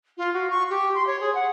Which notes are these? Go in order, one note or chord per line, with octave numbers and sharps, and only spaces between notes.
F4
F#4
C#6
G4
C6
C#5
G#4
F#5